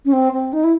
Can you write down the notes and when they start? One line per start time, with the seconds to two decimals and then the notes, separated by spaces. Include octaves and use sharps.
0.05 C#4
0.13 C4
0.33 C4
0.53 D#4
0.64 E4